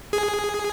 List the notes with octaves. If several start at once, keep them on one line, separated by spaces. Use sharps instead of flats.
G#4